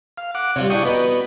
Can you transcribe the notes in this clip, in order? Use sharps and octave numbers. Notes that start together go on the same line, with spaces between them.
F5
F#5 D6
C3 G3 F4 C#5
C#3 D4 E4 G5 C#6 D#6
B2 B3 G5 A#5